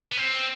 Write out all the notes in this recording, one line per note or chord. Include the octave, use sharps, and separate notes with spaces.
B3
C4